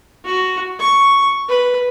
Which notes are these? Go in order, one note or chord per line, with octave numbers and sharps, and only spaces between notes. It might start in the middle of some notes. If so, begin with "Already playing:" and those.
F#4
C#6
B4